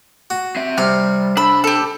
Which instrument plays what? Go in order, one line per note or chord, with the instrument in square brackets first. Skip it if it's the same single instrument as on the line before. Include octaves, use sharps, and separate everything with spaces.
[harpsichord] F#4
[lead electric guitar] C4 E5
[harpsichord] C3 [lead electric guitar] G3 [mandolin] F6
[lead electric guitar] D4 [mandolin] B5 E6
[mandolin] G4 A4